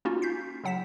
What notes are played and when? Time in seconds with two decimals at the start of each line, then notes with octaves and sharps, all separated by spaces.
0.05 A#3 C#4 D#4 F4 F#4
0.22 G6 B6 C7
0.64 C#3 F#3 F#5 B6 E7